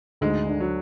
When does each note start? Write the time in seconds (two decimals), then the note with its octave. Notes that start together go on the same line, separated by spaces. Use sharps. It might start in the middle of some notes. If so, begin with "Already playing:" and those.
0.21 D2 G#2 G#3
0.47 D4
0.60 F#3